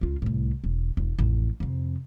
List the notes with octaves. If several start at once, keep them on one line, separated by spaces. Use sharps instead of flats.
C#2 F4
C2 A2
E1
E1
A1 F2
F2 C3